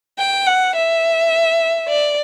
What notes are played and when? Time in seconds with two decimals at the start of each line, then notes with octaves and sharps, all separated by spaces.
0.18 G5
0.47 F#5
0.75 E5
1.88 D5